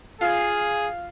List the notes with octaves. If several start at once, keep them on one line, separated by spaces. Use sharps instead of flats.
F4 G#4